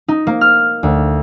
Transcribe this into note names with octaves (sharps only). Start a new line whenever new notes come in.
D#4
A#3
F6
D2